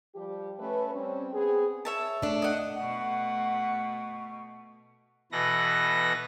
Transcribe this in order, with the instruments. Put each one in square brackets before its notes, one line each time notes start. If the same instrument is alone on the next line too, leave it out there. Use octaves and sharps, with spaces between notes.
[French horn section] F3 G3 G4
A3 C#4 B4
G3 C4 C#4
B3 C4 G#4
[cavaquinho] C#5 E5 A5
[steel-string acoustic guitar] A3 D4
[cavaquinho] D#5 F#5
[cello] B2 A3 [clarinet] F#5
[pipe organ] B2 E3 A4 B4 A#6